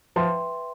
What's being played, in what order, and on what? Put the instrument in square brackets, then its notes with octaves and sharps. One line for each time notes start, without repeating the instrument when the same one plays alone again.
[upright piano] F3 [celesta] B4 E5 G5 C6